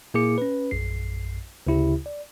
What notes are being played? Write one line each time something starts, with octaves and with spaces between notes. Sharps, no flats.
A#2 A#3 E4 G#4 D6 C#7
C#4 B4
A#1 F#2 C7
D2 C#3 E4 G4
D5